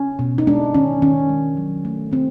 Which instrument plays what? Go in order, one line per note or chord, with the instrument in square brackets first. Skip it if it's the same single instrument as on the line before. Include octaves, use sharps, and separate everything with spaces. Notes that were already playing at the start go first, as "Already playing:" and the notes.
Already playing: [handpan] C#4
B2
D#4
G#3 D4
D#3 C#4
D#3 C#4
G#3
F#3
A3
D#3 C4